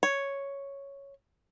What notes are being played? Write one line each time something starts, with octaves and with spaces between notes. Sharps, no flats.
C#5